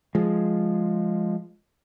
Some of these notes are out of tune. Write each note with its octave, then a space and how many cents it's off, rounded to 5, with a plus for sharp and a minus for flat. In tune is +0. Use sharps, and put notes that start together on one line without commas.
F3 +0 G#3 +0